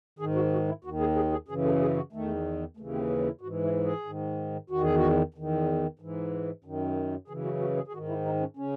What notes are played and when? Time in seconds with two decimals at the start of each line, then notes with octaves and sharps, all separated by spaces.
0.19 G#2 D#3 G#4
0.35 F#4
0.52 F#4
0.68 E4
0.84 D#2 D#3 F#4
1.00 G#4
1.16 G#4
1.32 G#4
1.48 F#2 C#3 E3 G#4
1.65 A4
1.81 G#4
1.97 F#4
2.13 E2 D#3 A3
2.77 D#2 C#3 E3 A3
2.93 C4
3.10 C#4
3.26 E4
3.41 G#2 F#4
3.46 E3
3.63 E4
3.85 G#4
4.06 G#2 D#3
4.70 E2 D#3 F#4
4.83 G#4
4.96 F#4
5.34 E2 D#3
5.99 G#2 E3
6.64 F#2 D#3
7.28 F#2 C#3 E3 G#4
7.45 F#4
7.61 F#4
7.77 G#4
7.88 G#4
7.92 G#2 D#3 F#4
8.08 E4
8.26 D#4
8.40 C#4
8.57 C#3 C#4